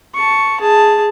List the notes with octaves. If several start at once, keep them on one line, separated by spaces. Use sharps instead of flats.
A5 C#6
G#4 A5